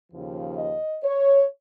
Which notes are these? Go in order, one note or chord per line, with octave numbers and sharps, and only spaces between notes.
D#2 C#3 F3
D#5
C#5